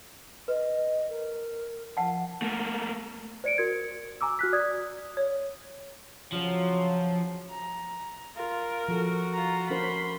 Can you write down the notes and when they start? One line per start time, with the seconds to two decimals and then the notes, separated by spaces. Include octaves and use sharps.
0.48 B4 D#5
1.09 A#4
1.97 F3 F#5 A5
2.42 A3 A#3
3.44 C5 D5 C#7 D7
3.57 F#4 A#4 G#6 C#7
4.21 G#5 A#5 D6 E6
4.39 F#4 F6 F#6 B6
4.53 D5 D#6 G#6
5.17 C#5
6.32 C#3 F3 F#3
7.51 A#5
8.37 F4 A#4
8.88 F3 F#4 A4
9.34 F4 A#5
9.70 C#4 A#4 C5 B5 C6